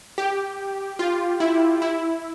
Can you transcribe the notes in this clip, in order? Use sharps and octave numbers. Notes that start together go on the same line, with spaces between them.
G4
F4
E4
E4